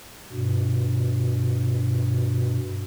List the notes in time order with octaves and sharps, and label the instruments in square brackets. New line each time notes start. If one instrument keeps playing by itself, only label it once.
[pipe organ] G2 B2